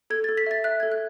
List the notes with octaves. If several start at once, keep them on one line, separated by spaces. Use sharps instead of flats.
A4 G#6
A4 A6
B6
E5 A6
E5 F#6
A4 G#6
F#6